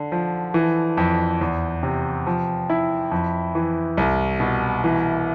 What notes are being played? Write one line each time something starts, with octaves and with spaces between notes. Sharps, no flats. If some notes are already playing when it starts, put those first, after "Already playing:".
Already playing: D3
F3
E3
F2
E2
C3
F3
E4
F2
E3
C2
B2
E3